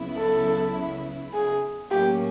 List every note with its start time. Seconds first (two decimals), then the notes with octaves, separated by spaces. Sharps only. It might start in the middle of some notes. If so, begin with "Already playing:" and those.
Already playing: C#2 C#3 F#3 B3 E4
0.17 A4
1.33 G#4
1.91 A2 F#3 A#3 C#4 G4